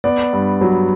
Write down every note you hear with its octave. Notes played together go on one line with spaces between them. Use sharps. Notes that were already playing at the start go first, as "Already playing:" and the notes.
B3 D5
G2
F#3